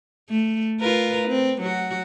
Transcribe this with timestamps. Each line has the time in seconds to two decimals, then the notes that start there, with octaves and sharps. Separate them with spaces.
0.30 A3
0.80 F4 A#4 B4
1.28 C4
1.61 F#3 F#4